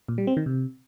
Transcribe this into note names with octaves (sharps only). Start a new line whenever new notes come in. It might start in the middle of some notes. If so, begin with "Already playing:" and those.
A#2
G3
C4
D#3
C3